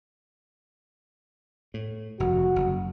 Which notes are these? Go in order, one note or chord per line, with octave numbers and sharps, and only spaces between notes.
A2
F1 G2 F#4
F#1